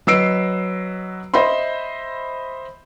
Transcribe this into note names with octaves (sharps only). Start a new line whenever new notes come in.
F#3 B4 D#5 E6 C7 D7
C5 D#5 E5 B5 C6